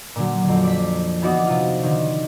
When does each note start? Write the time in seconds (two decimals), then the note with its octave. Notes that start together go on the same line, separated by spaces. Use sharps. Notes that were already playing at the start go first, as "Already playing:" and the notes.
0.16 A#2 D3 F#3
0.44 F2 D3
0.64 D5 B6
1.22 E3 B3 D#4 F#4 D5
1.47 C3 F4
1.83 D3 D#3